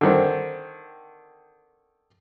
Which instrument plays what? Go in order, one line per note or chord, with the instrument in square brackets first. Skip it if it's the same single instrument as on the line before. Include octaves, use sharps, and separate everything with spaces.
[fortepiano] D3 D#3 C4